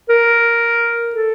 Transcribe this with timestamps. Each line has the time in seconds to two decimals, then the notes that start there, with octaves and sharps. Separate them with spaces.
0.09 A#4
1.15 A4